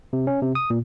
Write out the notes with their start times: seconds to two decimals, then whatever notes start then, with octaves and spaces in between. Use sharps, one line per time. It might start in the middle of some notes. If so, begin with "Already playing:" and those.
0.13 C3
0.27 C#4
0.42 C3
0.55 D#6
0.70 A#2